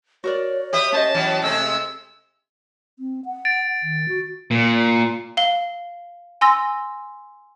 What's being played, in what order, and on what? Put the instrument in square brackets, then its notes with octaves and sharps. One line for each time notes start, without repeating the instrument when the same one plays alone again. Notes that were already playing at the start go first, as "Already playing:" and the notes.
[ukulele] F#4 A#4 D5 [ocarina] C#5
[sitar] G4 B4 E5 [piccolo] D#6
[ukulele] C#4 C5 D#5 [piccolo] A5
[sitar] E3 F#3 B3
[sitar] C3 G#3 A3 [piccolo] E6
[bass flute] C4
F#5
[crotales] A6 D7
[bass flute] D#3
F#4
[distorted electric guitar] A#2
[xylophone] F5 G7
G#5 C6 E6 A#6